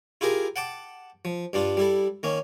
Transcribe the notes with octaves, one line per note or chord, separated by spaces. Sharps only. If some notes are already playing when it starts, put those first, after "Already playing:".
E4 F4 G4 G#4 A#4
F#5 G5 A5 D6
F3
G2 G3 D4 F4
G3 E4 A4
D#3 A#3 C#4